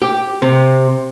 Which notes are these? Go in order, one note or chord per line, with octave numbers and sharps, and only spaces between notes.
G4
C3